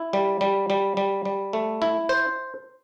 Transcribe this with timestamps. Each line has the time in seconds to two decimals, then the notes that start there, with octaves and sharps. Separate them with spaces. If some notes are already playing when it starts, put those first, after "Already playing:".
Already playing: E4
0.13 G3
0.41 G3
0.70 G3
0.97 G3
1.25 G3
1.53 A3
1.82 E4
2.09 C5